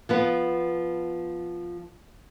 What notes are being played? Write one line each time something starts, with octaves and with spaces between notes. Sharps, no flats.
F3 B3 B4